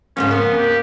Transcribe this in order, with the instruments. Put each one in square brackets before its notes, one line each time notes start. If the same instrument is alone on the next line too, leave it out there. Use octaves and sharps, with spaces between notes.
[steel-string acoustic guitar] F2 G#2 C#3 [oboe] C#4
[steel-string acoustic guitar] A#3 [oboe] B3
[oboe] G4